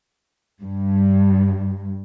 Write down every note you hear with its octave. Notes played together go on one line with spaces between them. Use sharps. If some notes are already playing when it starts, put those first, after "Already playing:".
G2